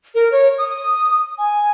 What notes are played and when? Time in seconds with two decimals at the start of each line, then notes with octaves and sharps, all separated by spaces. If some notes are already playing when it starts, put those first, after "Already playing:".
0.15 A#4
0.31 C#5
0.58 D#6
1.38 G#5